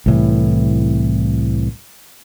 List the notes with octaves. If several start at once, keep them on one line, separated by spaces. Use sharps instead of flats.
C2 A2 E3